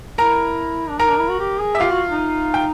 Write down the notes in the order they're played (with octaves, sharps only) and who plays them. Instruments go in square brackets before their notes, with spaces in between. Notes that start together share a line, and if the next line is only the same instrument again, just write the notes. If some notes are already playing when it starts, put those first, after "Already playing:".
[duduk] E4 [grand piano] A#4 A#5
[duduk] D4
[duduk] D#4 [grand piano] A#4 A#5
[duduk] D4
E4
F#4
G4
G#4
[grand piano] E5
[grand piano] F4 F5 [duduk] G4
[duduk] F#4
D#4
[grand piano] G5